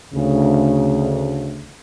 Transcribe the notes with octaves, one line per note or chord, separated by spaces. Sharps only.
D2 C#3